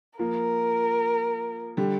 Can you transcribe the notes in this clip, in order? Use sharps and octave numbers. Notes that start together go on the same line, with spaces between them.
F3 A#3 A#4
D3 G3